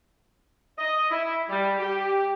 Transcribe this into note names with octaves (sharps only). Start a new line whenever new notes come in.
D#5
E4
G3
G4